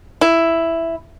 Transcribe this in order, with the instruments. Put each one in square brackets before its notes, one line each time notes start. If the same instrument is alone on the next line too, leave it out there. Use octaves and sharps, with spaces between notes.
[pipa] E4